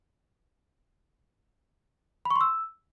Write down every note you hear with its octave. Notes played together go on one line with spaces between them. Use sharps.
B5
C#6
C6
E6